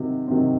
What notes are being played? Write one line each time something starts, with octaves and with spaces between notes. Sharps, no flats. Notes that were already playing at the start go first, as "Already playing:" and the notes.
Already playing: C3 D#3 F#3 C4
C3 D#3 F#3 C4